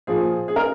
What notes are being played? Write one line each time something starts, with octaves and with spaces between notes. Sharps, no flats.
A#2 F3 G#4
G#4
A#4